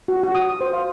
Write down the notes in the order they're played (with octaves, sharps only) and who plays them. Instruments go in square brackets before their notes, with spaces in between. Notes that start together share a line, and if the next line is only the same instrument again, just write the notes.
[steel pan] F#4
F#4
D#6
C5
F5